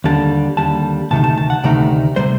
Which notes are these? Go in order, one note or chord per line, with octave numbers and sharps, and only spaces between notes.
D#2 D3 G3 A5
D#2 D3 G3 A5
D2 C3 D#3 A3 D#4 A5
A5
A5
F#5
D2 C3 D#3 A3 D#4 D5
C3 G3 C5